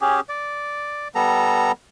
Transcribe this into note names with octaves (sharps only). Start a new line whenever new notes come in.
C#4 G4 G#4
D5
G3 B3 A4 A#5